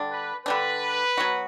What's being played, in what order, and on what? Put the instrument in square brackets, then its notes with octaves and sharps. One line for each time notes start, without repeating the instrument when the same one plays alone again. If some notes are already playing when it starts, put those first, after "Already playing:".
Already playing: [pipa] D3 G3 D4
[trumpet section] B4
[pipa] D3 G3 D4 [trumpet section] B4
[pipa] F#3 B3 F#4